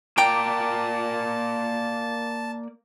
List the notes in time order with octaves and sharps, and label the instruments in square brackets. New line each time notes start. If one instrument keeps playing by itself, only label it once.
[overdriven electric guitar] A#3 D5 [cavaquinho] G5 A#5 D6 [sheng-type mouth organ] A5